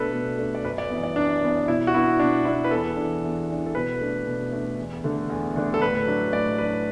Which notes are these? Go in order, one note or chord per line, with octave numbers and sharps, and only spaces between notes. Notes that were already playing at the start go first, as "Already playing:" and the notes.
Already playing: B2 A3 D4 A4 B4
B2
A3 D4
D5
F#2 B4
D5
E3 B3
D5
F#2 D4
E3 B3
B2 E4
F#4
B3 D4 E4
B2 D4
B3 D4 E4
B4
E2 A4
D4
E3
E2
E3 D4
A4
B2 B4
A3 D4
B2
A3 D4
E2
D3 A3 D4
E2
D3 A3 D4
A4
A2 B4
F#3 D4
A2 D5
F#3 D4 B4